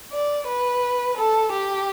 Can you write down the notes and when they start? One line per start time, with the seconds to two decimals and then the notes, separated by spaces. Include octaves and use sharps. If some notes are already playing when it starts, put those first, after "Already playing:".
0.12 D5
0.47 B4
1.17 A4
1.52 G4